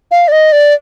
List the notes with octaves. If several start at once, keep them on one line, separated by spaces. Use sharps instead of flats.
F5
D5
D#5
D5